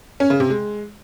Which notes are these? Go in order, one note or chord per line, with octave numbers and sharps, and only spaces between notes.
C#4
C#3
C3
G#3